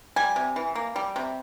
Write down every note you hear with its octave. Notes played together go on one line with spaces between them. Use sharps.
G3 G#5
C3
E3
A#3
G3
C3